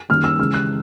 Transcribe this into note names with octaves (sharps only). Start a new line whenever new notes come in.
F#2 D#3 G3 A#3 F6
E6
C#3 E3 G#3 F6
F#6